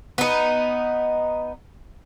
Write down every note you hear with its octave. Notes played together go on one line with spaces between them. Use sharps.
B3 D#4